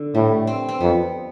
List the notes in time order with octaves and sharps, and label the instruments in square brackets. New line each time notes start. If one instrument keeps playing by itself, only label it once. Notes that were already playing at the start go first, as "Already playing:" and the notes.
Already playing: [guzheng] D3
[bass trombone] A2 [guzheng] G3
[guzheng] C4
C4
[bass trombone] F2 [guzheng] B3